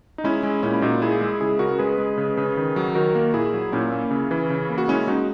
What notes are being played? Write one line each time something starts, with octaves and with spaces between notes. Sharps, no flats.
D#4
G#3 C#4 E4
G#3
A#2 C#4 E4
E4
A#2 D#4 F#4
G#3 E4 G#4
G#3
C#3 E4 G#4
C#3 F#4 A#4
G#3 G#4 B4
G#3
C#3
C#3
D#3
F#3
D#3 F#4 A#4
A#3
A#2 E4 G#4
F#3
A#2 C#4 E4
A#3
C#3
E3
C#3
A#3
F#4
G#3 C#4 E4
G#3 D#4 F#4